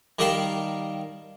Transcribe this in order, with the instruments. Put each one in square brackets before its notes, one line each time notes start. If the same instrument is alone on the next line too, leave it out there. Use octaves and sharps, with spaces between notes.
[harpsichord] D#3 G3 G4 A#4 F5 A5